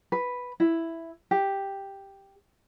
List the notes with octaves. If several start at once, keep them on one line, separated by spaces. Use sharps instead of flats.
B4
E4
G4